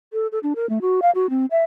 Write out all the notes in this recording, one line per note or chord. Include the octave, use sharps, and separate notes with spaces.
A4
A4
D4
A#4
A3
F#4
F5
F#4
C4
E5